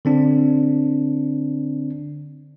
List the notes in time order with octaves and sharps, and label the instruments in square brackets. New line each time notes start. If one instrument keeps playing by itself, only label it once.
[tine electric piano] D3 C4 D4